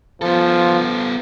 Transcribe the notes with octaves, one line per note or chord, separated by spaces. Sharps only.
F3 B3 A4